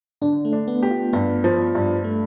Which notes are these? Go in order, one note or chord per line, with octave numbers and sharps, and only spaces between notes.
D3 D4
A3
D4
B3
G4
F4
G2 B3
F3
G2
A3